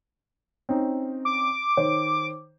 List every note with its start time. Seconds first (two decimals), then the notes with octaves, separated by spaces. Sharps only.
0.69 C4 C#4 D#4
1.25 D6
1.77 D#3 C5 C#5